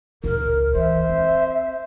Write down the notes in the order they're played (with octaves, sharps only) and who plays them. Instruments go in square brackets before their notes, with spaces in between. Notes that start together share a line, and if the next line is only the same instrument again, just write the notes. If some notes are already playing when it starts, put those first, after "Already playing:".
[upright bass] C#2 A2 [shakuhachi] A#4
[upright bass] E3 [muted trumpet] C5 [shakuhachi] E5
[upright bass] C4